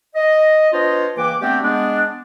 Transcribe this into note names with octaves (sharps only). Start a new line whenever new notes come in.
D#5
B3 D4 F4 C5 C#5 D#5
C#2 E3 A#3 B4 G5 D6
G3 A3 B3 C4 D4 G4
G#3 B3 D4